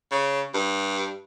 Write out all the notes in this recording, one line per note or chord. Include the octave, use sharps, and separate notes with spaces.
C#3
G2